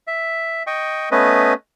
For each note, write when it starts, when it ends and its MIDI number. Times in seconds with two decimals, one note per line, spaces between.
0.07 0.63 76
0.67 1.09 75
0.67 1.09 79
0.67 1.09 85
1.11 1.53 57
1.11 1.53 59
1.11 1.53 61
1.11 1.53 71
1.11 1.53 75